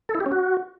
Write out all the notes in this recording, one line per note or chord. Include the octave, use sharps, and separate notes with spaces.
A4
E4
G4
C#4
F#4